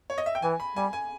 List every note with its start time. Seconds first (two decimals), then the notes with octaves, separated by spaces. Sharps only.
0.10 C#5
0.18 D#5
0.26 E5
0.35 G5
0.42 E3 G#5
0.60 B5
0.76 G3 G#5
0.93 G#5